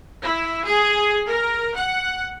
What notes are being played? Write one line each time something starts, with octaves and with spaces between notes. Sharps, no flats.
E4
G#4
A#4
F#5